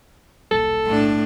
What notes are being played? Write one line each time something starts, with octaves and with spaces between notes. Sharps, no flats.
D#1 B1 A4
A2 D4